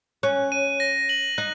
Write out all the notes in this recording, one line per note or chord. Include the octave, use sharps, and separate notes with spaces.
C#4 F#6
D#7
A#6
F#7
D#4 F#6